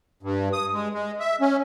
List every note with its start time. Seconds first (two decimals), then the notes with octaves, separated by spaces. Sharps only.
0.23 G2
0.53 D#6
0.74 G#3
0.93 G#3
1.20 E5
1.41 C#4